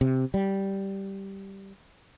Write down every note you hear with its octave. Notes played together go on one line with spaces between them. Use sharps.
C3
G3